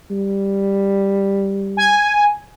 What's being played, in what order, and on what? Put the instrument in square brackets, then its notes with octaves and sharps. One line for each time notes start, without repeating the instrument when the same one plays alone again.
[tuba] G3
[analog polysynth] G#5